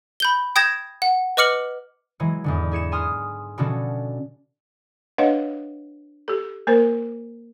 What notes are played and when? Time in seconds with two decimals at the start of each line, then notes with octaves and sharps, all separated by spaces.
0.20 B5 G6 G7
0.56 G5 D#6 G6 G#6 A#6 E7
1.02 F#5
1.37 B4 D#5 D6 F6 C#7 F#7
2.20 E3 F#3 G#3
2.44 E2 G#2 D3
2.71 E4 G#4 C#7 E7
2.92 G#5 C6 D#6 F6
3.58 B2 D3 F3 C#4 F#4 A4
5.18 D4 B4 C#5 D#5 F5 F#5
6.28 G4 A4
6.67 A#3 A#4 C5